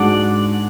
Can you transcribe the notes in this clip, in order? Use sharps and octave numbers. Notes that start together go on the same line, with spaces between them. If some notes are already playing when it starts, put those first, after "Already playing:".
Already playing: G#2 G#3 D4 F#4 D5 F#5